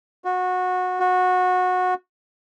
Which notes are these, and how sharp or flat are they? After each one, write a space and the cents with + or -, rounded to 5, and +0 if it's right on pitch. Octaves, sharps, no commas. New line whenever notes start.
F#4 -20
F#4 -20